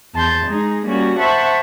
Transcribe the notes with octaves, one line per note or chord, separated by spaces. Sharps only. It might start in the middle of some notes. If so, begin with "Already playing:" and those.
E2 A5 C6 G6
G#3 D#4 G#4
G3 A#3 C#4 F#4
C5 E5 F#5 A5 B5 C#6